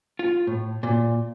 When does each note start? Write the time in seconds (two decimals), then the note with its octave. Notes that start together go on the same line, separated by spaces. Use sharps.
0.19 F4
0.47 A2
0.83 A#2